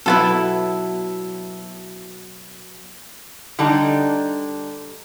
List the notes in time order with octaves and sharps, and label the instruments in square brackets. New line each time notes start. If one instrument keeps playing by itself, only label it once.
[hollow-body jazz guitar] B2 F#3 B3 [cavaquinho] E4 F4 A4
[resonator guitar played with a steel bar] D3 G3 D4 D#4